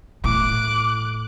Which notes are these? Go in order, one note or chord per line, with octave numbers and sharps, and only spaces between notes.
A2 D6 F#6